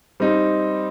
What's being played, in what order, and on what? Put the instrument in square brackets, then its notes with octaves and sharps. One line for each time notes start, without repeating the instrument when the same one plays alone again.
[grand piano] G3 C4 D#4